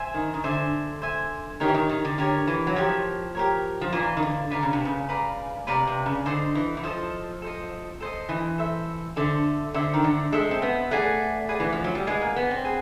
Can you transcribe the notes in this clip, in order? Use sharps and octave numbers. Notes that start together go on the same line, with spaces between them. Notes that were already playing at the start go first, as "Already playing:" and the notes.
Already playing: C5 E5 G#5
D#3
D#3
D3 C5 E5 G#5
C5 E5 G#5
D#3 G4 A#4 C#5
E3
D#3
D#3
D3
D3 G4 A#4 C#5
E3
F#3
F3 G4 A#4 C#5
G4 A#4 C#5
F3
E3 B4 D5 F5 A#5
D#3
D3
D3 B4 D5 F5 A#5
C#3
C3
C#3
B4 D5 F5 A#5
C3 B4 D5 F5 A#5
C3
C#3
D3 A4 C5 D#5
E3
E3
F3 A4 C5 D#5
A4 C5 D#5
A4 C5 D#5
E3
A4 C5 E5
D3 A4 C5 E5
D3 A4 C5 E5
D#3
D3
G#3 A4 C5 E5
C4
B3
A3 G#4 B4 D5 F#5
G#4 B4 D5 F#5
E3
F3
F#3
G3
G#3 G#4 B4 D5 F#5
A#3
B3
C4
G#4 B4 F#5